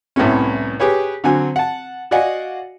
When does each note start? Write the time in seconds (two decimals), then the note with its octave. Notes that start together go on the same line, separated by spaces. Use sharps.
0.16 C2 A2 C3 B3 C#4
0.80 G4 G#4 B4 C#5
1.24 D3 F#3 C4 G#5
1.56 F#5 A5
2.11 F#4 D5 D#5 F5 F#5 G#5